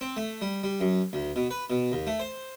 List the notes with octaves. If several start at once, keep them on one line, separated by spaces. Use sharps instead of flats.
C4
A3
G3
G3
F#2
D2
B2
B4
B2
D#2
A3
C5